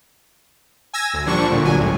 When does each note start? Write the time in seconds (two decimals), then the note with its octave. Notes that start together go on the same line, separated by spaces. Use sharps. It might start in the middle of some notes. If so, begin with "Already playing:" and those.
0.94 G#5 E6 G#6 A#6
1.14 D2
1.26 A#2 F3 G3 D4 C#6
1.50 A#2 D3
1.63 G1 F#3 G#5
1.77 C#2 A2